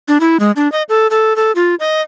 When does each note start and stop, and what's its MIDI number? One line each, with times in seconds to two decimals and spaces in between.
0.08 0.18 62
0.20 0.37 64
0.40 0.51 56
0.56 0.70 62
0.72 0.83 75
0.89 1.07 69
1.10 1.36 69
1.36 1.52 69
1.55 1.75 65
1.80 2.01 75